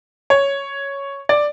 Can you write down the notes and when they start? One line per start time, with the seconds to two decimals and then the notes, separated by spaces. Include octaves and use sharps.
0.30 C#5
1.29 D5